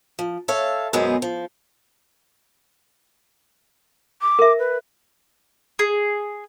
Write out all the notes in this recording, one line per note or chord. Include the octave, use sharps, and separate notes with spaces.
F3
A4 C#5 E5 F5
F#2 B2 G#3 B3 G#4 C5
F3
D6
A#4 E5
B4
G#4